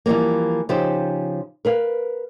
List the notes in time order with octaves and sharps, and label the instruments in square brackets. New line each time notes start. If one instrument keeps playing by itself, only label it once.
[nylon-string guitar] E3 F3 G3 A3 A#3
C#3 F3 D#4 G4 C5
A#4 B4 F5